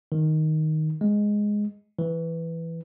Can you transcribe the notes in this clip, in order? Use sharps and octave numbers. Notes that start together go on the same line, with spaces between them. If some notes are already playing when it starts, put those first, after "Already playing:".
D#3
G#3
E3